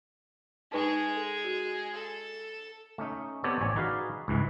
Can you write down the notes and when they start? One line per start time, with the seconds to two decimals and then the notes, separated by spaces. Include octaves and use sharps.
0.72 G#3 D#4 G#4 B4 A5
1.16 A4
1.44 F#4
1.94 A4
2.98 A3 C#4 D#4
3.44 B3 C4 G4 A4 C#5 D5
3.61 A1 C#5 D5 G#5
3.76 D#4 F#4 G#4 B4 D5 F5
4.28 C#2 G#2 E3